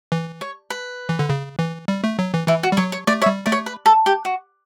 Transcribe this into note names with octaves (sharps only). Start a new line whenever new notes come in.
E3
C#5
B4
E3
D3
C#3
E3
G3
A3
F#3
E3
E3 E4
F#4
G3
F#3 C#5
C#5
A3 D5
C#5 E5
G3
A3 D5
C#5
B4
A4
G4
F#4